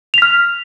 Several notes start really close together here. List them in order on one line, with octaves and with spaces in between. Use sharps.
F7 B6 F6